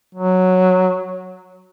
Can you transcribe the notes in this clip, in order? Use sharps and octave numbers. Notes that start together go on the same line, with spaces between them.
F#3